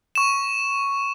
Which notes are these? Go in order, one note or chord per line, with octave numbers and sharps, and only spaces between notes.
C#6 E7